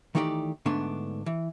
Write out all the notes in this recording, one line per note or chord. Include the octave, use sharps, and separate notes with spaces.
D#3 E3 A3 D#4 G4 D5
G#2 D3 A3 B3 D4
E3